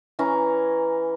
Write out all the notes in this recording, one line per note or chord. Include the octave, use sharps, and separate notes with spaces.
E3 C#4 A#5